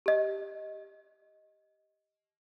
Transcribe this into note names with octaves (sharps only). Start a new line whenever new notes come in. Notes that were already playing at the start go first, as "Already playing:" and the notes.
G4 D#5